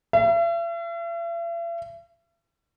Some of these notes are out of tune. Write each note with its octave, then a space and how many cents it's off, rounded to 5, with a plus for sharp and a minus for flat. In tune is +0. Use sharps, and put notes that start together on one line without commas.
E5 +45